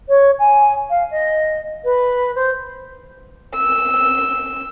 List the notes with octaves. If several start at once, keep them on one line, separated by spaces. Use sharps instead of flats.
C#5
G#5
F5
D#5
B4
C5
E6